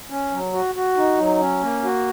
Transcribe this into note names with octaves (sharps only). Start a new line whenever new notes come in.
C#4
F#3
F#4
F#4
D#4
F#3
C#4
A#3
F#4